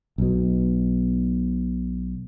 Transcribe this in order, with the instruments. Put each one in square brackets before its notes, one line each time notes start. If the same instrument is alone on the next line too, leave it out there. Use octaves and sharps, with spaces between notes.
[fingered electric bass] B1 B2